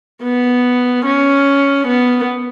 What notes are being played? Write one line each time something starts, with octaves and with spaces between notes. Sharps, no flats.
B3
C#4
B3